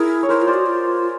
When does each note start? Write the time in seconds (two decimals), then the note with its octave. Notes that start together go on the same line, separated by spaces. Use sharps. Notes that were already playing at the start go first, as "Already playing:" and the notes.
Already playing: E4 G#4 A#4
0.23 C#5
0.29 E4 A#4 C5
0.41 F4
0.47 C5 D5
0.54 F#4
0.66 F4